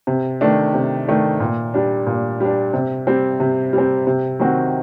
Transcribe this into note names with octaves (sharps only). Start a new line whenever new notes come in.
C3
D#3 A3 D4
C3
D#3 A3 D4
A#2
G3 D4
A#2
G3 D4
C3
G3 C4
C3
G3
C4
C3
D#3 F#3 C4 F#4